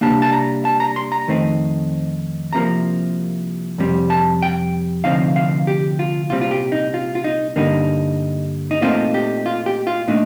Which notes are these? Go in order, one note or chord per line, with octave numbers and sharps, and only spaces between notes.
C3 G3 A#3 D4 A5
A5
A#5
A5
A#5
C6
A#5
F2 D#3 A3 C4 D#4
C2 C3 F3 A#3 A#5
F2 C3 G3
A5
G5
D2 C3 F3 C4 D#4 F5
F5
G4
F4
C2 A#2 G3 C4 F4
F4
G4
D#4
F4
F4
D#4
G2 D3 G3 A#3 D#4
D#4
A#2 A3 C4 D#4 F4
G4
F4
G4
F4
A#2 A3 D4 D#4